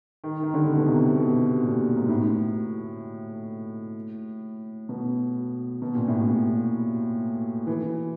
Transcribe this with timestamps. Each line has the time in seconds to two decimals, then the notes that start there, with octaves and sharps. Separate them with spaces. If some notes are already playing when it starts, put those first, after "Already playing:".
0.24 D#3
0.43 D#3
0.54 D3
0.77 B2
0.85 C3
1.16 B2
1.63 A#2
1.97 G#2
2.09 A2
4.89 B2
5.82 B2
5.95 A#2
6.08 A2
6.20 A#2
7.67 E3